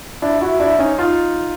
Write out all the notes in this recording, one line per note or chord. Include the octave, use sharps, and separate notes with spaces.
D4 E4
E4 F#4
D4 E4
C#4 D#4
D#4 F4